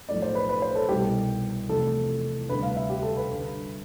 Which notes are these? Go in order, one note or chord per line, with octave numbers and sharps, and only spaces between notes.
B1 A2 F3 A3 D5
C5
B4
B4
C5
A4
C2 B2 G3 G4
E2 C3 F3 A3 A4
D2 C3 G3 B4
F5
E5
G4
A4
B4
G1 G2 D3